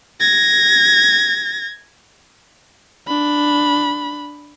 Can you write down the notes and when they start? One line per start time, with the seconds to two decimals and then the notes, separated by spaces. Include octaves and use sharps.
0.20 G#6 A#6
3.08 D4 B5